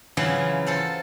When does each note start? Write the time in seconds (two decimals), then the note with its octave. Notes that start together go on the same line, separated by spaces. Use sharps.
0.17 C#3 E3 F#3 F4 E5 C6
0.66 F4 A4 C5